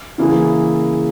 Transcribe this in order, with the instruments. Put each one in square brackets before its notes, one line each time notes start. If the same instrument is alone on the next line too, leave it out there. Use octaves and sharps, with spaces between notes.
[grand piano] C#3 E3 A#3 E4 G#4